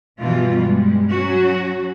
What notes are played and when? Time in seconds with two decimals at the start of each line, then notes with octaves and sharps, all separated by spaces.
0.19 G2 B2 E3 F3 G3 F4
0.59 G2 G3 G#3
1.10 F#3 C#4 F#4